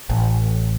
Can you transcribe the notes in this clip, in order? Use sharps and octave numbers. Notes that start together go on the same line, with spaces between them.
A1